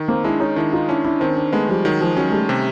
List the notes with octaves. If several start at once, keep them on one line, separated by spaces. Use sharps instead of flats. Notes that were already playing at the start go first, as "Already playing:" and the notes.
Already playing: D#3
A#3 C4
G#3 D4 E4
C#4 D#4
D#3 D4 E4
D#4 F4
C#4 D4 E4
D4 E4
D#3 C4 D4
C4 D4
G#3 A3 B3
F3 G3
D#3 F#3
F3
F#3 C#4
G#3
G3 A3
C3